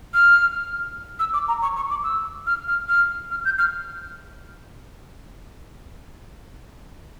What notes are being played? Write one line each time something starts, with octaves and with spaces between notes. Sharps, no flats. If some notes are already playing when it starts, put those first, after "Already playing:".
F6
E6
D6
A#5
C#6
C#6
D6
E6
F6
F6
F6
F6
G6
F6